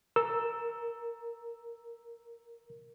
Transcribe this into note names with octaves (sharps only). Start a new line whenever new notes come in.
A#4 E6